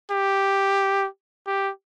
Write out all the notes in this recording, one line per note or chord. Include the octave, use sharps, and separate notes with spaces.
G4
G4